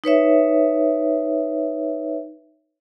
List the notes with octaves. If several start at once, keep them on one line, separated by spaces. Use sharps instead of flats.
D#4 B4 C#5 E5